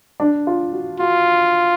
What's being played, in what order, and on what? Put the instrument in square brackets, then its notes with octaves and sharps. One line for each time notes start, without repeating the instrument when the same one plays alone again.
[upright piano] D4
F4
F#4
[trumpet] F4 [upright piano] F#4